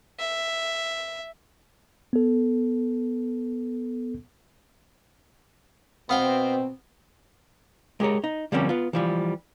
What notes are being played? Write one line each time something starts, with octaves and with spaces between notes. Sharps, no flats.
E5
B3 A4
B2 B3 C4 F5 G5
G#3 G4 A#4 C#5
D#4
D3 F3 G3 A#3 C4 C#4
B3 F4
E3 F3 G3